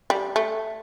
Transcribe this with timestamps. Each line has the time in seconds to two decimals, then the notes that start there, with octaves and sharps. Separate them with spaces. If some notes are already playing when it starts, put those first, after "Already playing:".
0.10 G3
0.36 A3